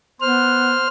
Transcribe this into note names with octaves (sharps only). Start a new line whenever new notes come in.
B3 C5 F6